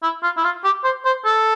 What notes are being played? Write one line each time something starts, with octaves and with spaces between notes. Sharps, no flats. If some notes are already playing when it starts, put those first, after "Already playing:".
E4
F4
E4
F4
G4
C5
C5
A4